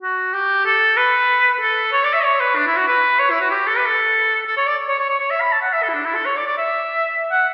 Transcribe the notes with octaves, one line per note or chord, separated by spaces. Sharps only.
F#4
G4
A4
B4
A4
C#5
D5
E5
C#5
B4
D4
E4
F#4
B4
C#5
E4
F#4
G4
A4
B4
A4
A4
C#5
D5
C#5
C#5
C#5
C#5
E5
B5
A5
F#5
E5
A4
E4
D4
E4
A4
C#5
D5
D5
E5
F#5